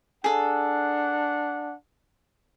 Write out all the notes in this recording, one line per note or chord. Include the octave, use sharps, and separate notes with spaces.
D4 G#4 A4 F#5